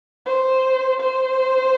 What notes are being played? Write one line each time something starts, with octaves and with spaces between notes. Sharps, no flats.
C5
C5